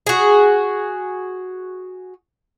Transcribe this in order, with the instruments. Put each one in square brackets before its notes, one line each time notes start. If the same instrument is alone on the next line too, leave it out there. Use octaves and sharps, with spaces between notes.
[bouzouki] F#4 G#4